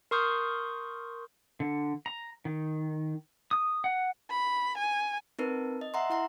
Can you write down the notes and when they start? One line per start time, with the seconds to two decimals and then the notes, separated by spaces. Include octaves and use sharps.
0.11 A#4 C6 C#6 D#6 F6 G6
1.60 D3
2.06 A#5
2.45 D#3
3.51 D#6
3.84 F#5
4.31 B5
4.78 G#5
5.39 C4 D#4 A#4 B4
5.81 D#5
5.94 E5 F#5 A#5 C6
6.10 E4 F#5 A#5 C6